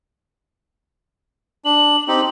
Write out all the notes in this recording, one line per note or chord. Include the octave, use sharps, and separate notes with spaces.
D4 F#7
C4 D#4 G4